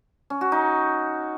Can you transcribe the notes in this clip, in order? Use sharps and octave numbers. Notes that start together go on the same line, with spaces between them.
C#4
F#4
D#4